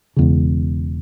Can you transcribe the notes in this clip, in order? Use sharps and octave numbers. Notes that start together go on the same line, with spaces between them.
E1 E2 C#3